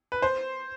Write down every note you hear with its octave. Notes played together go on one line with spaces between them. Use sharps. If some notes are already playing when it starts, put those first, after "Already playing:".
B4
C5